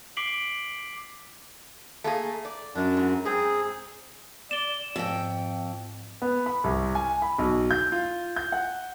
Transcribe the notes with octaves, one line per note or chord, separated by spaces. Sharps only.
D6 B6 C7 D7 F#7 G7
A3 A#3 G#4
D5
F#2 D4
G#2
G#2 C4 G#4
D5 E7 G7
F2 G#2 G5
B3
B5
C2
G#5
B5
B1
G6
F4
G6
F#5